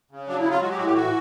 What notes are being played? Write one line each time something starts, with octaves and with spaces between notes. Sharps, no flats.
C#3
F#3 D4
E4
F#3
F4
G#3 F#4
G4
A2 F#4
G4
E3 F#4